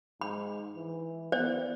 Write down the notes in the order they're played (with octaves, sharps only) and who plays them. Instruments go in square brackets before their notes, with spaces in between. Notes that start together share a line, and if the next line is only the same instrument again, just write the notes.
[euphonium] G#2 [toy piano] B5
[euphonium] E3
[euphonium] B3 [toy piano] C5 D5